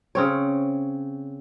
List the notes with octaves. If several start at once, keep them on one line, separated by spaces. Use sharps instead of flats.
C#3 C4 C#5